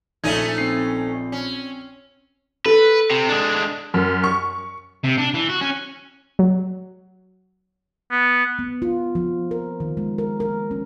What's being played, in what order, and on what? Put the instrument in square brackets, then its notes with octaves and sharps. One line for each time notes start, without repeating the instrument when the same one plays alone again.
[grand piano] A#1 D#7 [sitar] A3 C#4 D#4 [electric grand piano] G#6
[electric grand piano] C4 C7
[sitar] C#4
[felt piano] A4 [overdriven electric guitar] B4
[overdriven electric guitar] C3
G#3 D4
[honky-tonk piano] F#2
C#6
[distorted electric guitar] C3
D4
E3
F#4
C#4
[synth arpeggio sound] F#3
[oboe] B3
[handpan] B3
F4
F3
A#4
D#3
G#3
A#4
A#4
C#4